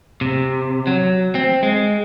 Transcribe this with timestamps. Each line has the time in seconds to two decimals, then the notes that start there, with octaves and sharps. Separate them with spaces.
0.21 C3
0.87 F#3
1.35 C4
1.63 G#3